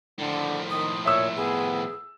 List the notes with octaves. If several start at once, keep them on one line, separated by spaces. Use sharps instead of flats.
A2 D3 F3
D#3 D#6
A#2 C#5 E5 E6
B3 G#4